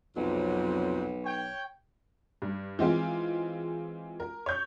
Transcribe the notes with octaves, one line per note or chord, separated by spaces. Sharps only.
B1 F2 C3 F#3
C#5 G5
G2
E3 G#3 C4 F4
A#4
C#5 G6